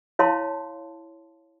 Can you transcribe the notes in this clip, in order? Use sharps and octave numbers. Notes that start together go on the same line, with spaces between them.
E4 C#5 F5 A5 C6